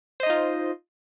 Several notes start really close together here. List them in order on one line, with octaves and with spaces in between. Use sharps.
C5 D#5 D#4 F4